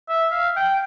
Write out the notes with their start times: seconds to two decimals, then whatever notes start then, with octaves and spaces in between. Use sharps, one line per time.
0.09 E5
0.32 F5
0.56 G5